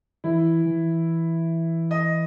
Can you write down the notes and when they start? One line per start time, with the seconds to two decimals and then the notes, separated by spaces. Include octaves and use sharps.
0.24 E3 E4
0.66 E3
1.91 D#5